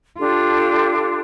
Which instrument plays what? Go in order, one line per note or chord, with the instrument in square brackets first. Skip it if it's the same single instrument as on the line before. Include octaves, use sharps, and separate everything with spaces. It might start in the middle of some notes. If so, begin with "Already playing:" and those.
[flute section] D4 G4 A4 [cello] F4